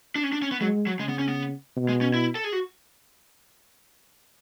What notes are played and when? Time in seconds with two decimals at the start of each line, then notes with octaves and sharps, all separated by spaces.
0.16 D4
0.24 C#4
0.33 D4
0.42 C#4
0.52 B3
0.61 F#3 G#3
0.87 F#3
0.99 C#3 G#3
1.09 B3
1.19 C#4
1.28 B3
1.77 B2
1.89 G#3
2.01 C#4
2.14 E4
2.35 A4
2.44 G#4
2.53 F#4